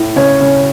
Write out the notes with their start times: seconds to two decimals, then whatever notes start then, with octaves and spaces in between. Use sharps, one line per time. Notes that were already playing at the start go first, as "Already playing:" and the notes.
Already playing: A2
0.16 C#3 C#5
0.41 C#3